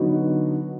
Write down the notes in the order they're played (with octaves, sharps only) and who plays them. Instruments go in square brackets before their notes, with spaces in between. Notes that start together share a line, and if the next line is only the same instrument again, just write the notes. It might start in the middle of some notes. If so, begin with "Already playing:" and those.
Already playing: [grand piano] D3 F#3 B3 D#4 F#4